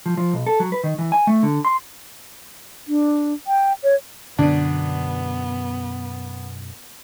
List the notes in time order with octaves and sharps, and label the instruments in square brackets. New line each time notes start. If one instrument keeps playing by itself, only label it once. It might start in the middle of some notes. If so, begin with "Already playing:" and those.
[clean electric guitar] F3
F3
B1
A4
F#3
B4
D#3
E3
G#5
A3
D3
C6
[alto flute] D4
G5
C#5
[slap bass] F#2 B2 [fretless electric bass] D3 [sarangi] B3 [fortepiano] D4